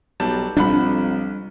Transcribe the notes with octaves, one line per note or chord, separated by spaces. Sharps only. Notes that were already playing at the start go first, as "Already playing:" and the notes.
B1 F#3 G3 A5
B1 F2 G3 D4 F#5 B5